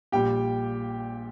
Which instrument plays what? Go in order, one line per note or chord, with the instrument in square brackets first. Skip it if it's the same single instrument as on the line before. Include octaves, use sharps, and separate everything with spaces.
[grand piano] A#1 A#2 G3 G4 G5